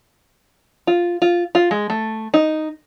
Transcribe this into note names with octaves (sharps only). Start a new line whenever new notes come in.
F4
F4
F4
G#3
A3
D#4